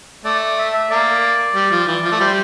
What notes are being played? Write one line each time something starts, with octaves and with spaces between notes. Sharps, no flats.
A3 D5
D5
E5
E5
A#3 D5
G3
F3
E3
F3
A3
G3 C5